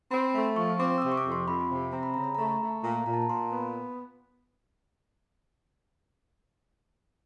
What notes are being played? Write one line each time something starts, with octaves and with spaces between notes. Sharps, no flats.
C4 B5
A3
F3 C#6
C4 D6
E6
C3 D#6
C#6
D6
F2
C6
F2 B5
C3
C4 A#5
B5
C#3 A#5
B5
A3 A#5
A3
A#2 A#5
A#2 A#5
A5
A#5
A#2 C6
B3